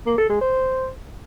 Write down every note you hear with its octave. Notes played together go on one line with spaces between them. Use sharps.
A#3
A4
G#3
C5